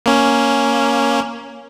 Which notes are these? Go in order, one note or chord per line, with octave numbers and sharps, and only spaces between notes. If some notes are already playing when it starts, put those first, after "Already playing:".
A#3 C#4